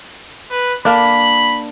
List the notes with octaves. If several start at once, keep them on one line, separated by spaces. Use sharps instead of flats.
B4
A#3 D4 B5